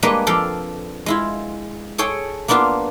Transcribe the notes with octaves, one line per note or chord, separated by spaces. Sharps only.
G3 G#3 A#3 D4 B4 D#5
F2 A4 D5 F5 G5
G#3 E4 F4
G#4 A4 C#5 G5
A#3 B3 D4 F4 F5